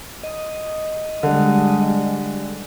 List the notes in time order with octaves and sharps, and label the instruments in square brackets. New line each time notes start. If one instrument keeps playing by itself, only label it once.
[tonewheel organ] D#5
[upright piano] D3 [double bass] G3 G#3